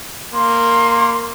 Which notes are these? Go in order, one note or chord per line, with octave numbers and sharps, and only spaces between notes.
A#3 C6